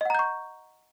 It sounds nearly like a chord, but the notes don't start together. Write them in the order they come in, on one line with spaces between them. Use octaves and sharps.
D#5 F#5 A#5 G6 C#6